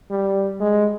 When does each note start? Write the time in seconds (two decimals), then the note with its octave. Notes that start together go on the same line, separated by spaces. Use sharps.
0.10 G3
0.60 G#3